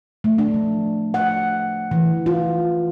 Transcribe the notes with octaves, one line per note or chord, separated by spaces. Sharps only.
A3
D4
F3
F#5
E3
F4